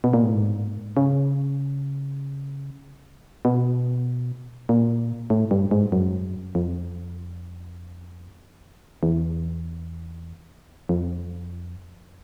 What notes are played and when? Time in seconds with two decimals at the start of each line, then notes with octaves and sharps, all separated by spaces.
0.04 B2
0.13 A#2
0.24 A2
0.34 G#2
0.97 C#3
3.45 B2
4.69 A#2
5.30 A2
5.51 G2
5.71 G#2
5.92 F#2
6.55 F2
9.03 E2
10.89 F2